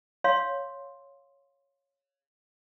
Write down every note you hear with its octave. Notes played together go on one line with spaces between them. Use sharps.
C#5 F5 C6